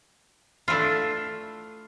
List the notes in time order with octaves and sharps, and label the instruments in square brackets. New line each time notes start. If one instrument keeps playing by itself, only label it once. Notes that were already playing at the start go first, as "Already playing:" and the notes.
[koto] A3 D4 E4 F4